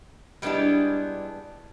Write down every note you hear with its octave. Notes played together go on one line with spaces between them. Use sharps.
G3 G#3 B3 D4 E4 G4